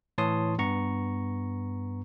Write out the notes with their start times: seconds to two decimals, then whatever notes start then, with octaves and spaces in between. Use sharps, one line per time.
0.18 A2 E3 C#5 A5 C6 D#6
0.58 G2 B3 A#5 C#6